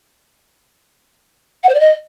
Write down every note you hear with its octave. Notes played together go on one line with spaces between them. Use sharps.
F#5
C5
D5
D#5